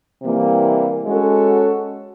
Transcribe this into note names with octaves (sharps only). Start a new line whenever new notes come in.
C3 E3 G3 A#3
G#3 C#4 F#4 A4